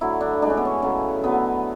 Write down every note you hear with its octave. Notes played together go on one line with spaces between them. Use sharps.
D3 F#3 A3 E4
D4
A2 G#3 D4
C#4
B3
C#4
C#3 F#3 A3
D3 F#3 A3 B3